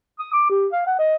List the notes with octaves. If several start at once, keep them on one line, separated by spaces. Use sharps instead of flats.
D#6
D6
G4
F5
F#5
D#5